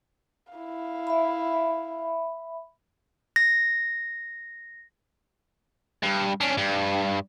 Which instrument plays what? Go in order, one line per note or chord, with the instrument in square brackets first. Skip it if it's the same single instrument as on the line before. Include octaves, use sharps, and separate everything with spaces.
[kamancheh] E4 F5
[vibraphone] E5 B5
[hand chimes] A#6
[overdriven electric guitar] G2
C#4 D4
G2